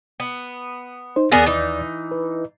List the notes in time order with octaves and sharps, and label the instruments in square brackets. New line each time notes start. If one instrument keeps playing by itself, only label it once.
[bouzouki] B3
[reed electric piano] D#4 C5
[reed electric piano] D#2 D5 A6 [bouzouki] B3 G#4 A#4
[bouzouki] E3 D#4
[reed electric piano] B4